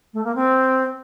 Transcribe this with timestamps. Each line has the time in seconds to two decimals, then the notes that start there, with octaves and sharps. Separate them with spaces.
0.13 A3
0.24 A#3
0.35 C4